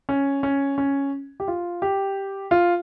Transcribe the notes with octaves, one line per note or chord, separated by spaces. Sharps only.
C#4
C#4
C#4
G4
F4
G4
F4